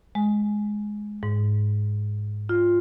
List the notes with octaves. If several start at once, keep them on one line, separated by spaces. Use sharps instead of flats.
G#3
G#2
F4